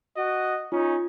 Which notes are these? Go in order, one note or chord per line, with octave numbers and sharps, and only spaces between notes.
F#4 D#5
C#4 D#4 F4